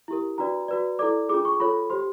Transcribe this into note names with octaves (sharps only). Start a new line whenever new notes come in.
E4 G4 A#4
D4 F#4 B4 D5 A#5
F#4 B4 D5
E4 A4 D5 D6
D4 F4 G#4 D6
C#6
F4 A4 C#5 B5
G4 C5 C6